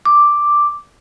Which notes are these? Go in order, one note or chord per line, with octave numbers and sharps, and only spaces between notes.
D6